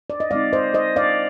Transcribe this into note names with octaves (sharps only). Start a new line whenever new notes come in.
D5
D#5
D3 G#3 C4 D#4 D5 F5
C5 D#5
C5 D#5
D5 F5